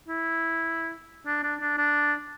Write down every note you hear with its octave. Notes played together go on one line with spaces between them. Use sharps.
E4
D4
D4
D4
D4